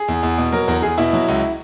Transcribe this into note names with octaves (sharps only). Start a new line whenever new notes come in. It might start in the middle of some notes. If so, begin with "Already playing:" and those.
Already playing: G#4
E2
E2
B2
F#3 A#4
E2 A#4
E2 G#4
B2 E4
F#3
C#2